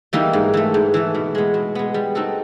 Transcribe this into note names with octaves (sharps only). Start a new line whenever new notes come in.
E3 G3 A#3 D#4
G#2
E3 A3
G#2
E3 A3
B2
G#3 B3
B2
G#3 B3
G3
C4 D#4 F#4 A4